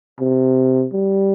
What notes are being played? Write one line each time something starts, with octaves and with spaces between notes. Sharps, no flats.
C3
G3